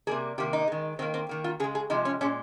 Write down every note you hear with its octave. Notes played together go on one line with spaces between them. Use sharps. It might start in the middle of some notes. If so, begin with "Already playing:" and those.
C3 G3 A#3 G#4
C3 D#3 A#3 G4
D#4
D#3 G#3
D#3 A#3 C4
C4
D#3 A#3
F4
C#3 G#3 G#4
G#4
C3 F3 G#3 D#4
C#4
A#2 G#3 C#4